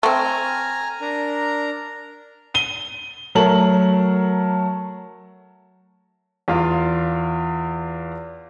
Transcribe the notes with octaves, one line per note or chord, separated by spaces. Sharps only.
A3 C4 G#5 A#5 F6
D4 A#4 A#5
D#7 G7
F#3 A3 A#4 A5 F#7
E2 F4 F5